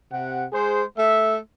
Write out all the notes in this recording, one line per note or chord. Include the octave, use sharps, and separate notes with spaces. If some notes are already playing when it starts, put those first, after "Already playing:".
C3 F#5
G#3 G#4 C5
A3 E5